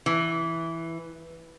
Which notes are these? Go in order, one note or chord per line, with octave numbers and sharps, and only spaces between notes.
E3